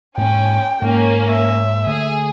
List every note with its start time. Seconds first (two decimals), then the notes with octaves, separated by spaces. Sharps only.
0.18 G#2 A#3 C#4 G5
0.82 G#2 A#3 C#4
1.30 E5
1.87 D3 A3 G#4